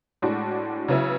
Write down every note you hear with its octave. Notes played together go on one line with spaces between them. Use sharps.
A2 G#3 D4 F#4
C#3 F#3 B3 E4